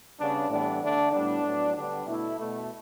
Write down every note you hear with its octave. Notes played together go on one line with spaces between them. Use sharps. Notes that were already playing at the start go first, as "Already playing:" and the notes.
C#3 G3 B3 D4
A2 E3 G3 B3 D4
D3 A3 D4
A2 G3 B3 D4
A2 F#3 B3
D3 G3 B3 D4
B2 A3 E4
B2 A3